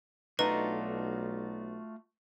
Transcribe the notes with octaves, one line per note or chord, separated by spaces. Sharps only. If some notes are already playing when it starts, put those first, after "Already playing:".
B1 A3 D4 D#4 F4 F#4 B4